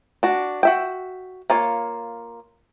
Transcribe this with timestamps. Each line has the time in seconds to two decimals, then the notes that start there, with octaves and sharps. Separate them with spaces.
0.23 D4 F#4
0.63 F#4 E5 G5
1.50 A#3 F4 C#5